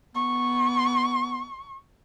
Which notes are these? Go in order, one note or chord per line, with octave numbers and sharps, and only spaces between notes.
B3 C#6